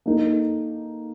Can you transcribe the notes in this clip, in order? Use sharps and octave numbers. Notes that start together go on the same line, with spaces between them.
A#3 D#4 A4